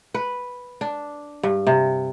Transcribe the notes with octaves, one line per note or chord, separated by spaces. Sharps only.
B4
D4
G2
C3